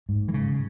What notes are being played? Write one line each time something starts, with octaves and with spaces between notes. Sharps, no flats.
G#2
E3
C#3